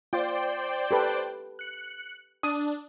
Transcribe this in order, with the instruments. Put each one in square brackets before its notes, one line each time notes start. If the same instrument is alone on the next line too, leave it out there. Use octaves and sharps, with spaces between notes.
[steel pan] F4 [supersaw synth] C5 D5 G5
[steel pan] G4 A4 B4
[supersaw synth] F#6 C#7
[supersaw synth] D4 [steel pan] D#6